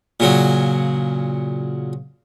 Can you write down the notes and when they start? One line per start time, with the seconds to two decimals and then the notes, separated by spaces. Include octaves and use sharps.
0.20 A#2 C#3 F#3